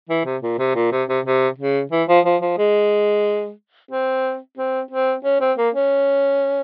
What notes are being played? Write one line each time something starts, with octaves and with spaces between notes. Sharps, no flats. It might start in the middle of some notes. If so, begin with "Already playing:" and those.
E3
C3
A#2
C3
A#2
C3
C3
C3
C#3
E3
F3
F3
F3
G#3
C4
C4
C4
C#4
C4
A#3
C#4